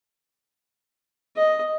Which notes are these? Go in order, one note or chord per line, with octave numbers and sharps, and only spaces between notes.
D#5